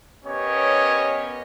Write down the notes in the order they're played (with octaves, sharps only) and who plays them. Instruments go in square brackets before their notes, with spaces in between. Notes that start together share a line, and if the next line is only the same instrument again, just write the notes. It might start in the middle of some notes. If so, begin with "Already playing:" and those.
[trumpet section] B3 C#4 G4 A#4 C#5 D#5